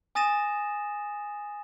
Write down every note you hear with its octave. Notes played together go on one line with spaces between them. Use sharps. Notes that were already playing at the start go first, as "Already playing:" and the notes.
G#5 D#6 A6 A#6 D#7 E7